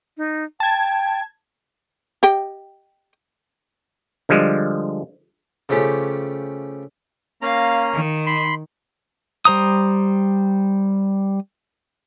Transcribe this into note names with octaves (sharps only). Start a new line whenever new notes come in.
D#4
G5 A5 G#6
G4 D#5 G5
D3 F3 G3 G#3
C#3 F3 A3 C#4 G4
A#3 C#4 F5 A#5
D#3
B5 C6
G3 C5 A#5 D#6